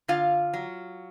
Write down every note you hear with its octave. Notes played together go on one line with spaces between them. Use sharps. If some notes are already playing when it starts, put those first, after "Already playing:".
D3 F4 F5
F#3